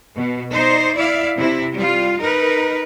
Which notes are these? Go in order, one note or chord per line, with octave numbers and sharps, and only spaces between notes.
B2
D#4 C5 D5
E4 D5 E5 F5
C3 C4 E4
G3 F4
D#4 A#4 B4